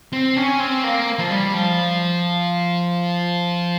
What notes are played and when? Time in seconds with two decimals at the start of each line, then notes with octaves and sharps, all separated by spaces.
0.13 C4
0.36 C#4
0.60 C4
0.84 A#3
1.19 F3
1.30 G3
1.54 F3